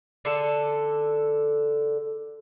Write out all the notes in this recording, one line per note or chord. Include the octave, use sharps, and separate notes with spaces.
D3 A4